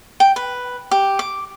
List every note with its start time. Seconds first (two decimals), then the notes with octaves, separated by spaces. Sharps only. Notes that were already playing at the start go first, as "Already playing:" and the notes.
0.20 G5
0.36 B4
0.91 G4
1.19 D6